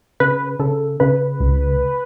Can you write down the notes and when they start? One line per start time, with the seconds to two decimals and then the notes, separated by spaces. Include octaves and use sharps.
0.20 C#3 B4
0.59 C#3 A4
1.00 C#3 B4
1.40 C#2